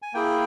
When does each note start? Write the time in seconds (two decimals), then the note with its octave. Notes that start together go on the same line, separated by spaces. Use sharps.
0.02 G#5
0.14 A#3 E4 G#4 G5